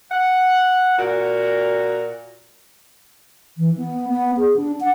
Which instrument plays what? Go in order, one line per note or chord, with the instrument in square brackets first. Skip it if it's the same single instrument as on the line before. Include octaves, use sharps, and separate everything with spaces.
[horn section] F#5
A#2 F#4 A#5
[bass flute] E3
B3
B3
G#4
D4
F#5